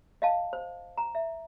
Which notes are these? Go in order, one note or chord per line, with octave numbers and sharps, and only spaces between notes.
D#5 F5 A5
C5
A#5
E5